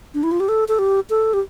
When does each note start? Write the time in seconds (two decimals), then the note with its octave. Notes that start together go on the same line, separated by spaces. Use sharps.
0.14 D4
0.23 E4
0.32 F4
0.40 G4
0.49 A4
0.68 A4
0.79 G4
1.10 A4
1.34 G4